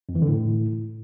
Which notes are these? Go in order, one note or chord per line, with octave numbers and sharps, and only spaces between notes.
F2
E3
D3
A2